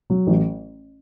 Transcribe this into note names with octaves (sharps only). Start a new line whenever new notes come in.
F#3
A1